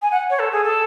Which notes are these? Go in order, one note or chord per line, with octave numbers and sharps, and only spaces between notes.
G#5
F#5
C#5
A4
G#4
A4